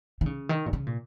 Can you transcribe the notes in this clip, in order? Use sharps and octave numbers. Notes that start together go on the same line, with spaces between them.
D#3
C#3
D#3
A#2
C#3
A#2